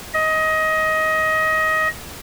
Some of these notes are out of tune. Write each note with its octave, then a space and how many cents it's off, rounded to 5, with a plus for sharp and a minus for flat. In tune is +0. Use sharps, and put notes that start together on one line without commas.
D#5 +20